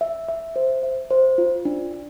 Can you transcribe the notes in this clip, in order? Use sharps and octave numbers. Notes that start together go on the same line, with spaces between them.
E5
E5
C5
E5
C5
F4
D4
D4